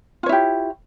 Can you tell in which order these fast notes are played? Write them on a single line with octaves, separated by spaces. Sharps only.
F4 C#5 E4 G4